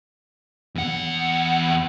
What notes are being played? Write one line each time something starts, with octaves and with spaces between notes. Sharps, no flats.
E2 F#5